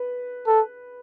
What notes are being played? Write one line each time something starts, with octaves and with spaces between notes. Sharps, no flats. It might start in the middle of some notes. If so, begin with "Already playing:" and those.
Already playing: B4
A4